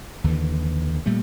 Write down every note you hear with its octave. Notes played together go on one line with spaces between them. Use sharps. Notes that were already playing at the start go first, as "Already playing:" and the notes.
D#2 D3 E3
A#2 G3 A3